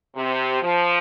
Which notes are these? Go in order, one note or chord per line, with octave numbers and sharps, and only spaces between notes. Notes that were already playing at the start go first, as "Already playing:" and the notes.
C3
F3